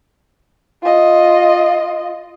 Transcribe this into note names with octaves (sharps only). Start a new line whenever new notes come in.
F4 D#5